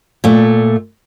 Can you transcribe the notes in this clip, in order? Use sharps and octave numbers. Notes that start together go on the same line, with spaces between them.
A#2 A3